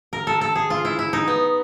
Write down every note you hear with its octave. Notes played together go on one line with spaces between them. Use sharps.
A#4
A4
A4
G#4
F4
E4
E4
D#4
B3